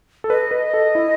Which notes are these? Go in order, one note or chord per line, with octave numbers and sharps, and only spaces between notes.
A4
B4 D#5
B4
A4
E4